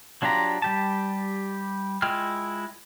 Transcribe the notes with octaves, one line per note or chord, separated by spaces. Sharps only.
F#3 D4 F4 G4 A#5
G3 G4 A5
G#3 E4 F4 G5 F6